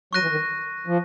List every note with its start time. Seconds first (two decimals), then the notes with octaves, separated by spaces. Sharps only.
0.13 F#3 C#6 F#6 A#6 D#7
0.22 E3
0.31 D#3
0.87 F3